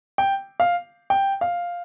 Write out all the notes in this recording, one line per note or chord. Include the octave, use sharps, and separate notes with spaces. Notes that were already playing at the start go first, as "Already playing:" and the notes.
G5
F5
G5
F5